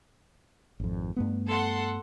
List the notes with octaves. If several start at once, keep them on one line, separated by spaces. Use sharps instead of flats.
G#1 F2
G2 A3 B3
A4 F#5 C6